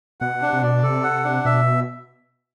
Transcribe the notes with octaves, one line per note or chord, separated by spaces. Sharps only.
B2 F#5
C3 D4
C3
B2 D5
C3 A4
F#5
D4
B2 E5